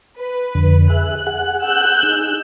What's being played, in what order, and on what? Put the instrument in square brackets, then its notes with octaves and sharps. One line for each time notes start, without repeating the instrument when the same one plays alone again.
[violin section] B4
[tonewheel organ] F2 D3
[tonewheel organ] G#4 E5 [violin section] F#6
[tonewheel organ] G#4 F#5
[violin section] E6 F#6 G6
[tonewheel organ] D#4 G#4